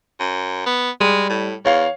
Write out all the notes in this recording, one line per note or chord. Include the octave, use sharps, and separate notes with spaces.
F#2
B3
G3 G#3
A2
E2 C#5 F5